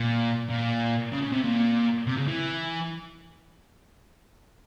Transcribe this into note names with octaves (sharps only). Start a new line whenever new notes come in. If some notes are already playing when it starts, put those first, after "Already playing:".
Already playing: A#2
A#2
C#3
C#3
C3
A#2
C3
C#3
E3